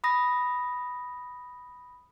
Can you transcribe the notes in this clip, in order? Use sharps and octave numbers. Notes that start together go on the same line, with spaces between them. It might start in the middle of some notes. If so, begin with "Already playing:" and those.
B5 D#6 A#6